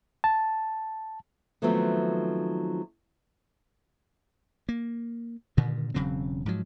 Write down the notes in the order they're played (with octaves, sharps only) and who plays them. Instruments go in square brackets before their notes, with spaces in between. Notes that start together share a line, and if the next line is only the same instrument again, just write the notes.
[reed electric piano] A5
[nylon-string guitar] D#3 F3 F#3 A3 B3 C4
[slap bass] A#3
G2 A#2 D3 D#3
E1 C#3 F#3 C4
G#2 F3 F#3